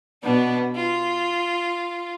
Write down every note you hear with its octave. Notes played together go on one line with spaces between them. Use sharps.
B2 B3 D4
F4